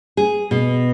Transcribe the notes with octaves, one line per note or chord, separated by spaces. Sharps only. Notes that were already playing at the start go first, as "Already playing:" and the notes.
G#4
B2